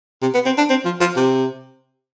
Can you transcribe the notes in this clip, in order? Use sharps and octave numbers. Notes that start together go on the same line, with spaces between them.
C3
B3
C4
D4
C4
F3
F3
C3